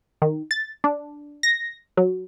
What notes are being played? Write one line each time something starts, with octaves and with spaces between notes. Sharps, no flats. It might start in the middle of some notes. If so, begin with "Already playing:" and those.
D#3
A6
D4
A#6
F#3